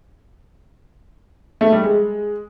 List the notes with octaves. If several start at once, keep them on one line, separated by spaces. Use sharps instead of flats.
A3
G3
G#3